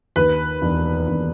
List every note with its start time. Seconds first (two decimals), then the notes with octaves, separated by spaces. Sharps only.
0.16 D#2 B4 B5
0.62 E1
1.08 E1